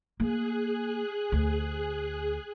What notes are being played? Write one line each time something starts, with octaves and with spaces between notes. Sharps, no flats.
A#3 G#4 F#6
D2